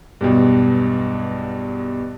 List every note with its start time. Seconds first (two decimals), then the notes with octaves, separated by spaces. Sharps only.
0.21 B1 E2 G2